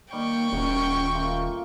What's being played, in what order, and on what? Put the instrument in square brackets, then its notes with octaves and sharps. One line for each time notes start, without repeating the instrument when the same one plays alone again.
[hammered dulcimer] D#3 G3 [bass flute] A#3 [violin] G5 C#6
[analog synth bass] D#1 [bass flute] C#4 [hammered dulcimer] F#4 A#4
[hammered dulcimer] A3 A#3 F4